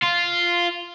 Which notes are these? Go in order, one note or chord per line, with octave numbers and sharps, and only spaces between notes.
F4